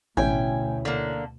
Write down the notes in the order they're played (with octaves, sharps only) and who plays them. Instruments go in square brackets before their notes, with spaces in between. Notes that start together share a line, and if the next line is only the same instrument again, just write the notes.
[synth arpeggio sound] A1 [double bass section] D2 B2 [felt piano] C#4 E4 [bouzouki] G5 G#5
[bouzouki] D3 A#3